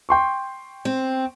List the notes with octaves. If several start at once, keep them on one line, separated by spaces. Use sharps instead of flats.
G5 C6 C#6
C4